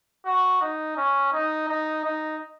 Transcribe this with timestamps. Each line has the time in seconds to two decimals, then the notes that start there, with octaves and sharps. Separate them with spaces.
0.26 F#4
0.62 D#4
0.97 C#4
1.33 D#4
1.68 D#4
2.05 D#4